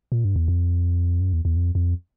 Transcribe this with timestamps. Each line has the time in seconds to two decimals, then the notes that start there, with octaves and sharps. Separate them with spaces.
0.12 A#2
0.25 G2
0.36 E2
0.48 F2
1.21 F#2
1.33 E2
1.45 E2
1.56 F2
1.75 F2